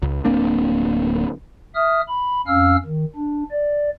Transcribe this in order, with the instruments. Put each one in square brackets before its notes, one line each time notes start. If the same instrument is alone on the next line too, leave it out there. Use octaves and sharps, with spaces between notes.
[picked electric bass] C#2
D1 A#3 C4 D4
[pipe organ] E5 D#6 F6
B5
F2 C#4 F5 E6 F6
D#3
D4
D5